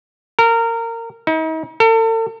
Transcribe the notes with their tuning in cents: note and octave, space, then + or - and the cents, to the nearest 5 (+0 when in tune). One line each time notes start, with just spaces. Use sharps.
A#4 -25
D#4 +40
A4 +40